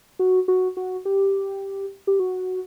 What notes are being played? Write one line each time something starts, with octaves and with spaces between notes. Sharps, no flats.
F#4
F#4
F#4
G4
G4
F#4